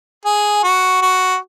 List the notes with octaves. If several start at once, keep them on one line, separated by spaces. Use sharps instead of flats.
G#4
F#4
F#4